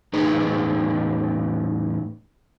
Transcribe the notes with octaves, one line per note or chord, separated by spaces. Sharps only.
E2 A2 D#4 G#4 B4